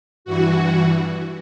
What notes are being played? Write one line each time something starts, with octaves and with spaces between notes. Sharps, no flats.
G2 E3 F#4